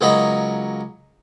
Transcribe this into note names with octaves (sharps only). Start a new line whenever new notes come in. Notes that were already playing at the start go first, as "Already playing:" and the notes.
C#2 F#3 A#3 D#5 B5